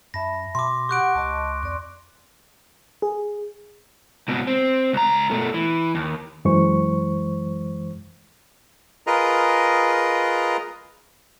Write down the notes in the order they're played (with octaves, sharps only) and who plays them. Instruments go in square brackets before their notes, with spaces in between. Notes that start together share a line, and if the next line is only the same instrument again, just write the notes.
[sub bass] F#2 [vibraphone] E5 A5 B5 [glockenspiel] A#6
[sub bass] B2 [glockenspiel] C6 D6
[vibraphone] G4 F#5 [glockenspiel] C#6 F#6 D7
[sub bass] C#2 [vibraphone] D#5 A5
[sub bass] F2 [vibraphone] D5 C6
[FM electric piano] G#4
[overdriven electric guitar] C#2 B2
C4
C#2 A#5
B2 A3
E3
D#2
[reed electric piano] F#2 E3 G#3 C5 C#6
[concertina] F4 G#4 A#4 B4 D#5 A#5